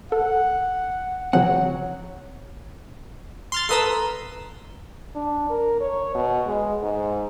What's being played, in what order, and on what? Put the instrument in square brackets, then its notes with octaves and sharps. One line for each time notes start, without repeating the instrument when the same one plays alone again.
[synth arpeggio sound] A4 [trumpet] F#5
[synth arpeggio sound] C#3 F3 C4 [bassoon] F#3 [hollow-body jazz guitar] F#5
[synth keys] C6 F6 A6
[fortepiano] A4 B4 A#5 [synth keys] C6 D#6 E6
[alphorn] D4
A#4
C#5
B2
G#3
G#2